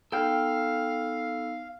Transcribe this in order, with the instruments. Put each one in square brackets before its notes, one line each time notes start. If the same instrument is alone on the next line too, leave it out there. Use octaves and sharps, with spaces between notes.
[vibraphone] B3 D#4 E6 [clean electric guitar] A4 G5 [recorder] F5